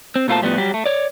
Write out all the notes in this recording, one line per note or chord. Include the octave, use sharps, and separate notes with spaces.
C4
B2 A3 A#3 F4 C5 A5
A2 F3 G3 A#3 B3
F#3 G3 G4
A3
C#5 D5